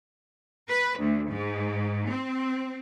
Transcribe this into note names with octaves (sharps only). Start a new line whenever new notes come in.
B4
D2
G#2
C4